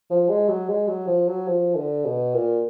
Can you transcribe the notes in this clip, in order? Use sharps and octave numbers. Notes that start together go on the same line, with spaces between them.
F3
G#3
F#3
G#3
F#3
F3
F#3
F3
D3
B2
A#2